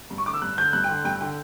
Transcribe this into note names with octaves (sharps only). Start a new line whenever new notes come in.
G2
C#6
D3 D6
E6
G2 F#6
D3 G6
G2 F#6
G5
D3
G2 G5
D3 G5